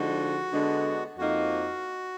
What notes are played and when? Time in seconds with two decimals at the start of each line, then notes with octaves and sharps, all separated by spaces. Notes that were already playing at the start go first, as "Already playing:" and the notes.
Already playing: D3 F3 G#3 D#4 F#4
0.52 D3 G#3 B3 D4
1.18 F2 F3 A#3 D#4 F#4